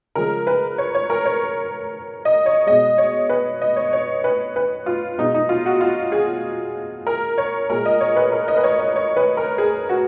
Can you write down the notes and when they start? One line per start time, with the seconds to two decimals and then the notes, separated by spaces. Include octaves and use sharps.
0.15 C#3 F3 G#3 A#4
0.47 B4
0.78 C#5
0.95 C#5
1.10 A#4
1.25 C#5
2.25 D#5
2.46 C#5
2.66 B2 G#3 D#5
2.98 C#5
3.29 B4
3.62 D#5
3.76 C#5
3.93 C#5
4.24 B4
4.56 B4
4.86 F4
5.18 B2 G#3 D#4
5.34 D#4
5.49 F4
5.66 F#4
5.81 F4
6.12 G#4
7.07 A#4
7.38 C#5
7.69 A#2 G#3 A#4
7.86 D#5
8.00 C#5
8.16 B4
8.32 A#4
8.48 D#5
8.57 B4
8.63 C#5
8.80 D#5
8.96 C#5
9.17 B4
9.37 A#4
9.58 G#4
9.89 F#4